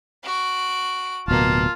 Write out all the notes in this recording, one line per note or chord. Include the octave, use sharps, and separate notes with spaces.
F#4 D7
D1 B2 A#3 F4 A5